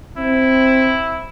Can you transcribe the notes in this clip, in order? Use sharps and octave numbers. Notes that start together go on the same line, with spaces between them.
C4 E4